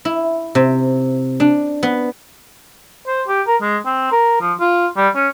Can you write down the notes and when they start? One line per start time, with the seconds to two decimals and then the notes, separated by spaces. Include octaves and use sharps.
0.05 E4
0.55 C3
1.40 D4
1.83 B3
3.07 C5
3.28 G4
3.47 A#4
3.61 G#3
3.85 C4
4.12 A#4
4.41 F3
4.60 F4
4.96 G3
5.15 C#4